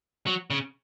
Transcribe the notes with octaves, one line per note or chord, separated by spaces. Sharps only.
F#3
C#3